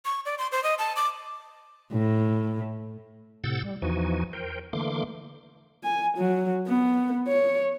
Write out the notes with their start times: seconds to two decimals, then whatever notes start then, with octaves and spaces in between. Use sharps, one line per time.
0.05 C#6
0.26 D5
0.39 C6
0.52 C5
0.64 D#5
0.78 A5
0.96 D6
1.93 A2
3.44 A2 C3 F#5 E6 G6 A6
3.64 G3
3.82 E2 E3 F3 D#4 F#4 G#5
4.33 A#4 C5 G5
4.73 D3 E3 A3 A#3 C6 D6
5.84 G#5
6.18 F#3
6.67 B3
7.28 C#5